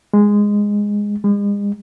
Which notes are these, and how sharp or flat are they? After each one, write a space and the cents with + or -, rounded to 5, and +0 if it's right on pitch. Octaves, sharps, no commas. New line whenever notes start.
G#3 -10
G#3 -40